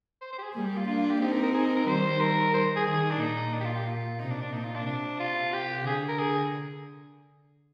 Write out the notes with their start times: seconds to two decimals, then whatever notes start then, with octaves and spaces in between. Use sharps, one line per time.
0.21 C5
0.33 C5
0.38 G4
0.43 G#4
0.54 G3 A#3 G#4
0.66 G4
0.77 F4
0.87 A#3 D4 F4
0.98 F4
1.10 G4
1.20 C4 D#4 G4
1.32 A#4
1.43 A#4
1.54 G#4
1.66 A#4
1.76 A#4
1.87 D#3 G3 C5
2.20 A#4
2.54 C5
2.76 G#4
2.87 D#3 G#4
3.11 D4
3.20 A#2 D#4
3.53 D4
3.61 G4
3.65 F4
3.75 G4
3.87 F4
4.20 C3 D#4
4.31 D4
4.42 D4
4.53 A#2 D#4
4.65 F4
4.76 D4
4.86 C3 D4
5.20 F4
5.53 G4
5.86 D3 G#4
6.08 A#4
6.19 G#4